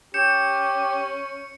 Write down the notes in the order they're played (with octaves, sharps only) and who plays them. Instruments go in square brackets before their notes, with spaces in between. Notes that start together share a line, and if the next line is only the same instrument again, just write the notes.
[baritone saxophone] C#4 [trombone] G4 [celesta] G6 E7 [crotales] C#7